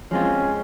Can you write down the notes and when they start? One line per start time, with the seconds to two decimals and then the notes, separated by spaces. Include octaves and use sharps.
0.11 F3 G#3 C4 C#4 F4